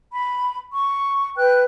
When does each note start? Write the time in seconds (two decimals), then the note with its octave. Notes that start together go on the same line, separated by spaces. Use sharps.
0.12 B5
0.73 C#6
1.36 B4 G5 F#6